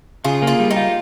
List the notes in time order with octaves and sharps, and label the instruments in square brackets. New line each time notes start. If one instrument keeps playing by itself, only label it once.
[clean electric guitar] C#3 [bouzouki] F4 G#4
[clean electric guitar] A#3
[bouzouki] F4 G#4
[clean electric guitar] G3
[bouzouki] D#4 G4
[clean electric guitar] F4